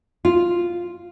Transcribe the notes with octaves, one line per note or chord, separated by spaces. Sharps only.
F4